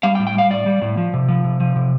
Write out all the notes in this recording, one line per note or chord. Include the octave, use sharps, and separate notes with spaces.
G3 F5
G5
A2
G5
G3 F5
A2 D5
G3
A2
F3
C3
F3
C3
F3
C3